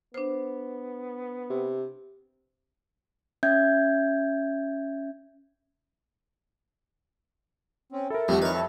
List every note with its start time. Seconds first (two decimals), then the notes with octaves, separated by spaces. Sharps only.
0.14 B3 D4 C5
1.50 C3
3.43 C#4 E5 G6 G#6
7.92 C4 C#4
8.10 E4 A4 A#4
8.28 F2 G3 A3 F#4
8.42 D#4 E4 A#4 B4 C#5
8.53 E4 A4